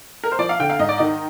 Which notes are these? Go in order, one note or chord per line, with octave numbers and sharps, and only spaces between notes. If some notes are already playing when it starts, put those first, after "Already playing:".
A#4
C5
F3 D5
F5
D3 G5
F5
G#2 D#5
D5
D#3 D#5